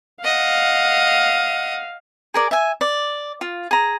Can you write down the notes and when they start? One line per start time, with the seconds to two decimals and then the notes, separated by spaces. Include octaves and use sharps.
0.24 D#5 F5 F#5
2.34 G#4 A#4 D5
2.51 E5 G#5
2.81 D5
3.41 F4
3.71 G#4 A#5